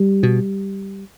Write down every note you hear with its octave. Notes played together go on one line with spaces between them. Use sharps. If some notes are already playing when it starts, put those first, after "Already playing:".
Already playing: G3
B2